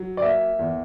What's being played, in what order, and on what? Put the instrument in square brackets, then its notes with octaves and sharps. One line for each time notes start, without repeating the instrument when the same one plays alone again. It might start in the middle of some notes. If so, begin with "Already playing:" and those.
Already playing: [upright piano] F#3
[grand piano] D5
[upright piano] A#3 [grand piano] E5
[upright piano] E2